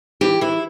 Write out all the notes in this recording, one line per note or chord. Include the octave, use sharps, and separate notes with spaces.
E3 G4
E3 E4